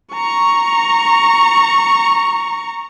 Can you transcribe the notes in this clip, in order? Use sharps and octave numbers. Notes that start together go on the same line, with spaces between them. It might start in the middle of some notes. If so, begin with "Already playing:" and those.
A#5 C#6